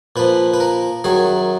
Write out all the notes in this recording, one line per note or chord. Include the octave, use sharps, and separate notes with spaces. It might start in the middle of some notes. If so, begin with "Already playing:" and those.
A#2 F3 B4
B4
A#4
F#2 D#3 F#3 G#4